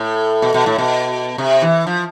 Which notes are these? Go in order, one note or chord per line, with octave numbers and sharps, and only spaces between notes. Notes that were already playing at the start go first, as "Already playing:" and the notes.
Already playing: A2
B2
B2
A2
B2
C3
E3
F3